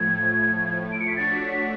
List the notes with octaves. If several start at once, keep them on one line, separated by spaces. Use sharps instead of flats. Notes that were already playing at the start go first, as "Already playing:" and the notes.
Already playing: A2 F3 A3 G#6
D7
C#7
B6
A3 D4 F#4 C#5 A6
B6
B6